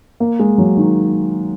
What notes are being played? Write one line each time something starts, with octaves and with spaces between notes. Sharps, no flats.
A#3
G#3
F#3
D#3